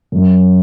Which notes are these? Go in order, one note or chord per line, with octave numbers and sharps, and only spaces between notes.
F#2